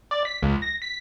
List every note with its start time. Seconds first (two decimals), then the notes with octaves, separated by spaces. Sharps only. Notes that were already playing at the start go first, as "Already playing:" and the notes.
0.11 D5
0.25 B6
0.43 C#2
0.62 A#6
0.82 B6